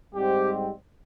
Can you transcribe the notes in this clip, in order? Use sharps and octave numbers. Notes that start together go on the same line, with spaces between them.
G#2 G3 C4 G4